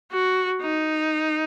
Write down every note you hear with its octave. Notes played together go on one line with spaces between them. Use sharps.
F#4
D#4